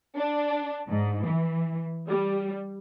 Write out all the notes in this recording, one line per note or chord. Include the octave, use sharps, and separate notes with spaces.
D4
G#2
E3
G3